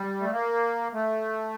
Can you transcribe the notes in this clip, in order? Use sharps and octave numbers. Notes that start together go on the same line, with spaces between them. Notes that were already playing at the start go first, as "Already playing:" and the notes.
Already playing: G3
A3
A#3
A3